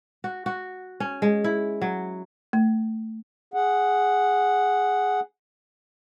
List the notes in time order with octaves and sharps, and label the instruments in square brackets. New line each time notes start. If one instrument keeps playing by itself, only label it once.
[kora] F#4
F#4
C#4
G#3
E4
F#3
[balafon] A3
[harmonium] G#4 F#5